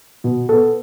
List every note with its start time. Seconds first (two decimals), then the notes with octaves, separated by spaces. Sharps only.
0.24 B2
0.49 B3 A4